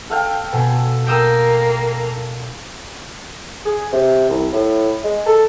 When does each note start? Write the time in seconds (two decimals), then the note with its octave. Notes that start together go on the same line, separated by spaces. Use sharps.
0.10 A4 F5 G5
0.53 B2 A4 G#5
1.07 A#3 G5 D#6 E6
3.65 G#4
3.93 C3
4.29 C2
4.52 A2
5.04 G#3
5.27 A4